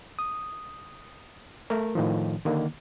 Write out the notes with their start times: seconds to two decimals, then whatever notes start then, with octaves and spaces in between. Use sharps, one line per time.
0.19 D#6
1.70 A3 A#4
1.95 A2 D#3 F3
2.45 D3 D#3 A#3